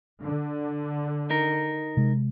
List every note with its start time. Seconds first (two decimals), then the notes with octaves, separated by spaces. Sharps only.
0.23 D3
1.30 D#4 A#4
1.97 C3 G#3